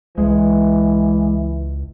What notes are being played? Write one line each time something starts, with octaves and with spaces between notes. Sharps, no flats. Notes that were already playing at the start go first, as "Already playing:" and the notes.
C#2 E3 G#3